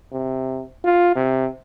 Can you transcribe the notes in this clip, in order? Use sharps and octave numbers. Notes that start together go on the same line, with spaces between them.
C3
F4
C3